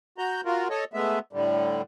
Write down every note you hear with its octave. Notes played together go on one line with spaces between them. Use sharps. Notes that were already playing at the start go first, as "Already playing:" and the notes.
F#4 A#5 G6
F4 F#4 A#4
A4 C#5 D#5
G#3 A3 B3 E5
A2 D3 G3